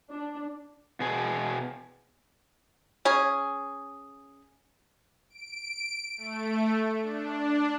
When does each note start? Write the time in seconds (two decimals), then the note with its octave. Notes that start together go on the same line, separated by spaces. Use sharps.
0.11 D4
1.00 B2 G#4
3.05 C#4 G#4
5.30 D7
6.17 A3
7.02 D4